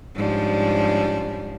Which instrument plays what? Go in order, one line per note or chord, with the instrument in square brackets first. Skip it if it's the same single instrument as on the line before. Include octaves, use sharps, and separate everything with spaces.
[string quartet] G#2 F3 G3 C#4 D4